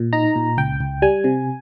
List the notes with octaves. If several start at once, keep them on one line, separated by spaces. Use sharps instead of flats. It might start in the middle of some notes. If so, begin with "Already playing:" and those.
Already playing: A#2
D#4 A#5
A#2
C#2 G5
C#2
G3 G#5
C3